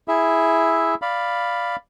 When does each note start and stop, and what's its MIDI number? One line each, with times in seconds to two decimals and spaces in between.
0.08 0.95 64
0.08 0.95 68
0.08 0.95 76
1.02 1.76 74
1.02 1.76 77
1.02 1.76 83